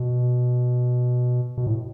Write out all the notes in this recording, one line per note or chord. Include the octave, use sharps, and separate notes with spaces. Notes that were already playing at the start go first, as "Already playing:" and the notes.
Already playing: B2
B2
A2